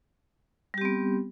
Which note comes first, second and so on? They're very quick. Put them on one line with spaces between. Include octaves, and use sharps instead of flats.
G3 G4 C4 B3